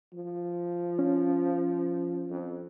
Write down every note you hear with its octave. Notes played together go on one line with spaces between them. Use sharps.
F3
C#4
F2